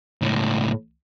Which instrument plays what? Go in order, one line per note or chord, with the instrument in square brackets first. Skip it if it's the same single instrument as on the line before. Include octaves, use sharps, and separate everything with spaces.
[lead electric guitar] C#2 A2